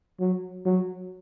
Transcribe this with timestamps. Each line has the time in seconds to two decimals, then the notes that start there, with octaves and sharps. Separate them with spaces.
0.20 F#3
0.66 F#3